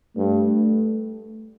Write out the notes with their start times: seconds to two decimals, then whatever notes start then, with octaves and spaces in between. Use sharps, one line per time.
0.16 G2 A3